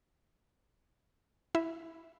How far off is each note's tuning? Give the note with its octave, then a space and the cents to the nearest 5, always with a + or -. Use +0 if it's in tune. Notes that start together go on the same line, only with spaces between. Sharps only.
E4 +0 E5 -5